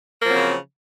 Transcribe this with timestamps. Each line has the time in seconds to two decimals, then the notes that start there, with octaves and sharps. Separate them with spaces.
0.22 A#3
0.25 F3
0.28 F#3
0.31 C4
0.34 C#3